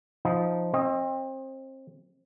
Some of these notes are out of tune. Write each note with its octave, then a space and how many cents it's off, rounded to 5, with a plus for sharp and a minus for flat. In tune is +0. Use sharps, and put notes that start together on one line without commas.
F3 +0 D#4 +0
C4 +30 D#5 +0